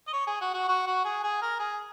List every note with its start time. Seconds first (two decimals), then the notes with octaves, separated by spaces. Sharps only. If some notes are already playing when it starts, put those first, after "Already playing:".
0.07 D#5
0.13 C#5
0.27 G#4
0.41 F#4
0.54 F#4
0.68 F#4
0.87 F#4
1.05 G#4
1.24 G#4
1.42 A#4
1.59 G#4